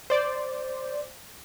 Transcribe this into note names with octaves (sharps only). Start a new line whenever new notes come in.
C5 D5